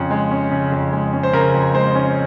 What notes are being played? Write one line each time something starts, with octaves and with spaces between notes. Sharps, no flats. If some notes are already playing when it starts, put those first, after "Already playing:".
Already playing: F2 C#3 C#4
G#3
C#4
C#3
F2
G#3
C#4
C5
C#3 A#4
F2
G#3 C5
C#4